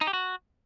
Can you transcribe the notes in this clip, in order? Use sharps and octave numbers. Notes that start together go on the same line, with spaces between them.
D#4
G4
F#4